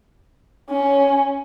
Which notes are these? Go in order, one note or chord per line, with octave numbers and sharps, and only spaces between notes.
C#4